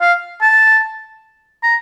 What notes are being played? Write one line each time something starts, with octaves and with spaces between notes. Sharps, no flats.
F5
A5
A#5